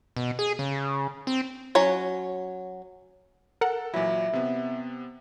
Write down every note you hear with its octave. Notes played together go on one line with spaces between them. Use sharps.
B2
G#4
C#3
C4
F#3 C#4 C#5
A4 A#4 F#5
A#2 E3 F#3 E4
C3 B3